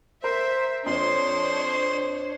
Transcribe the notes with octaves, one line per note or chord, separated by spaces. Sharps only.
A#4 C5 E5
F2 D4 C5 C#5 C6